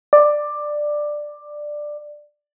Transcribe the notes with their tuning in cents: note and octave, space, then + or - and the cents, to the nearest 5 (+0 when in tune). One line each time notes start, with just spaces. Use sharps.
D5 +10